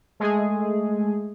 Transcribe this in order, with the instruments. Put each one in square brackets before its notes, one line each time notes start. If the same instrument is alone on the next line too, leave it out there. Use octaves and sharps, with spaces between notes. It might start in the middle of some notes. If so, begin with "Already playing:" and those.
[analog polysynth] G#3 A3 G#4